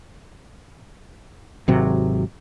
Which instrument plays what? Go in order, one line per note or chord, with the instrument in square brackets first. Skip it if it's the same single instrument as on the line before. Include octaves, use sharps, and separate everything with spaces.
[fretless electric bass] G#1 C3 F#3